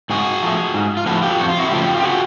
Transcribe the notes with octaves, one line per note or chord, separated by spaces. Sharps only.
G#2 F#4 G#4
F3 A3
G#2
F4
F3 A3 E4 F#4
F4 G4
F2 F#4
F4
E4 F#4
C#3 F3 A3 F4 G4
G4
F#4 G#4